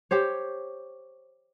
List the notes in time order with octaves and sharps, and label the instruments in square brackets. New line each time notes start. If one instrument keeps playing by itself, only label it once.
[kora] G4 C5 C#5